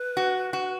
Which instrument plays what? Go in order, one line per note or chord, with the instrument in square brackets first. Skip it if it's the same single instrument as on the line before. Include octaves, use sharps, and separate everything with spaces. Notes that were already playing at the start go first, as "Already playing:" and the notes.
Already playing: [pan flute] B4
[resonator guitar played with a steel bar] F#4
F#4